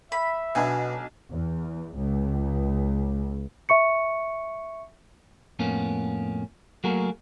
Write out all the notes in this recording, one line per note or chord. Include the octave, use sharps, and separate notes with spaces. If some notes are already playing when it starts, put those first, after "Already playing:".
E5 B5
B1 B2 D4 G#5
E2
C#2
E5 C#6 C#7
F2 A2 A#3 B3 C#4
F#3 A3 A#3 F#4 G#4 A#4